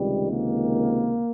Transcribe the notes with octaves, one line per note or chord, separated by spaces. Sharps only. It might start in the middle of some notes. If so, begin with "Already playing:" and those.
Already playing: C#2 C3 D#3 G3
A#3